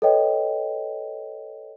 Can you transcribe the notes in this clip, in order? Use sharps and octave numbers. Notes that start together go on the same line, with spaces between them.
A4 B4 C#5 D#5 G5